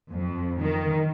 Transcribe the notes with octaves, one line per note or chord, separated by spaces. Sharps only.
F2
D#3